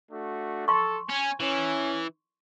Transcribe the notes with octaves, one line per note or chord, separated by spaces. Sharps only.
A3 D4 F#4
A4 C6 C#6
C#4 G#5
E3 C#4